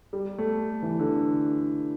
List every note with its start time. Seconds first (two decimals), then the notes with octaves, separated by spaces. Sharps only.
0.13 G3
0.39 A3
0.83 E3
0.99 D3